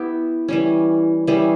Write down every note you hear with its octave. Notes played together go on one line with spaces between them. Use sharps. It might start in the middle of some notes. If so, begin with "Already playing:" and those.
Already playing: B3 E4 G4
E3 G3 C#4
E3 G3 C#4 G#4